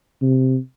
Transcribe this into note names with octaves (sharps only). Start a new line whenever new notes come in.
C3